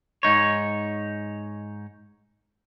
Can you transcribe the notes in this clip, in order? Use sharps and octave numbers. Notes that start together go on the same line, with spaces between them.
G#2 D#4 C#5